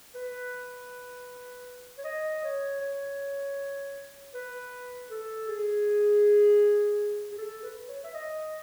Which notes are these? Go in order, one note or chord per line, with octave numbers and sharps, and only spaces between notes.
B4
C#5
D#5
C#5
C#5
B4
A4
G#4
G#4
A4
B4
C#5
E5
D#5